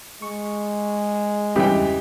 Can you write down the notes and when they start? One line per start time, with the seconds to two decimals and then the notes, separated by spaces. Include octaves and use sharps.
0.22 G#3 C#6
1.56 E2 G2 C#3 E3 D#4 G4 G5